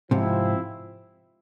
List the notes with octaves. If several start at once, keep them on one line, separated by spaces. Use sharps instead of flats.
G#2 C3 F3 C4 E4